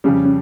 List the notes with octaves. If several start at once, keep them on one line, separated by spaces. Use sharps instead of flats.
F2 C#3 G3 C#4
C#4